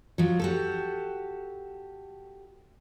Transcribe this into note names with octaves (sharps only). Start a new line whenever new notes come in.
F3 F#3
F#4 G4 A4